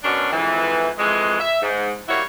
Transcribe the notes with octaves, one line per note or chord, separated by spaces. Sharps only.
F#2 B2 C#4 D4
F2 G#2 E3
F2 E3 G#3
E5
G#2
G3 A#3 E4 F#4 C#5